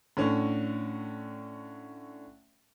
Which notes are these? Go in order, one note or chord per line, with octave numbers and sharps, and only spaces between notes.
A2 D3 C#4